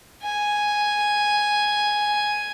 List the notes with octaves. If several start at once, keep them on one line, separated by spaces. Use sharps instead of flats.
G#5